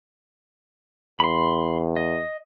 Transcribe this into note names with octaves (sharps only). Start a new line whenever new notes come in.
E2 B5 C6
D#5